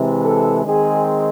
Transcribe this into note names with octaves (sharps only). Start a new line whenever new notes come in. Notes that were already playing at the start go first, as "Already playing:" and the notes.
Already playing: C3 E3 G#3
A4
D#3 G#3 C4 G#4